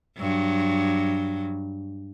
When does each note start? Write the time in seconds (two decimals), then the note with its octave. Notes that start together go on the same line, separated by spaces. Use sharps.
0.18 G2 F#3